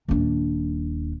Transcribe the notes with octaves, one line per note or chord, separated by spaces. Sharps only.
D#1 D4